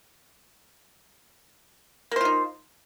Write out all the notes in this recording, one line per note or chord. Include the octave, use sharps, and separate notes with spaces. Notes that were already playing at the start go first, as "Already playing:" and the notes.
A#3 D#4 F4 C5